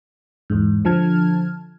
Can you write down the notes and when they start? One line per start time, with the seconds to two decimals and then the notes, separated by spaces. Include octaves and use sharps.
0.50 E2 G#2
0.85 D3 F3 A5 F6 G#6